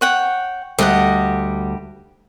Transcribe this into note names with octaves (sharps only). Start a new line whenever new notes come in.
C#5 F#5 G5
D2 G3 G4 D#5 F#5